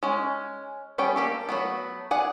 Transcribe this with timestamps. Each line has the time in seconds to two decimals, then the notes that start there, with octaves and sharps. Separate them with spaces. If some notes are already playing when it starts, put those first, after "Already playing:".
0.03 G#3 C#4
0.98 G3 B3 C#4 C#5 G5
1.16 A#3 G4 A4
1.49 F#3 A3 B3
2.11 G#4 D5 F#5 G#5